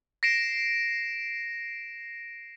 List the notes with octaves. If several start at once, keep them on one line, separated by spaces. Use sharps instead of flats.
A#6 C7 D7 E7